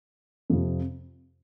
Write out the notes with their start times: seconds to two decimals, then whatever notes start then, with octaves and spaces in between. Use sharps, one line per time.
0.50 F2 C3 F3